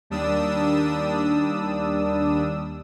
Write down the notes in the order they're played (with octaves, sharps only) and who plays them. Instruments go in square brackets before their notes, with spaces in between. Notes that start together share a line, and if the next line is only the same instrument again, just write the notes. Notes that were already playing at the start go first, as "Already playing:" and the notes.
[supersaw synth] D#2 G3 D4 D#6 E6